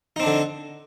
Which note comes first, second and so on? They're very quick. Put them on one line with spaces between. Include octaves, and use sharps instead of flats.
D#4 C4 D4 D3